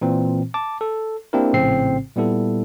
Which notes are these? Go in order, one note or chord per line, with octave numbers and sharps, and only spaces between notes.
A#2 E3 C4
A5 D6
A4
A#3 C4 D4 E4 G4 A#4
A#1 A2 C#3 C4 C7
A#2 G3 B3 E4 A4